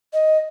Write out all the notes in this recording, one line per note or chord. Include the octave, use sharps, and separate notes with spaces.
D#5